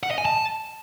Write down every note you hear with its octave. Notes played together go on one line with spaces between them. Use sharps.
F#5
D#5
G#5
A5